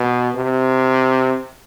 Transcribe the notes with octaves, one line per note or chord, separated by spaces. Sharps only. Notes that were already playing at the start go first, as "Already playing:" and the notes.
Already playing: B2
C3